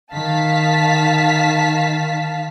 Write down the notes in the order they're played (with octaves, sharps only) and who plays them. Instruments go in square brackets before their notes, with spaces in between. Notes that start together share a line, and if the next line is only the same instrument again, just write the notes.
[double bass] D#3 [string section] F5 A5 B6